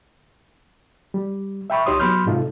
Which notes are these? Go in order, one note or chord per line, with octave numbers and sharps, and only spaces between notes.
G3
E5 G5 B5 C#6
C#2 D#4 G4 C#5 C6 D#6
F#3 B3 B5 C6 F6 G6
G#2 C3 D#4 F4 A4